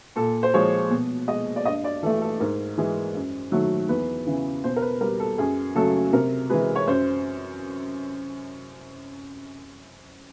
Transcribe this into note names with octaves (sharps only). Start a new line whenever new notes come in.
A#2 A4
C5
F3 G#3 C#5
B2
G#3 D#5
D5
G2 D#5
D5
E3 A3 A4
A4
G#2 A#4
E3 G#3
F#2
D#3 F#3 A3
E2 B4
C#3 E3
B2 C5
A#4
B4
G3 A#4
A4
F#2 G#4
C#3 F#3 A3 A4
C3 A#4
E3 G#3 B4
C#5
F#2 C5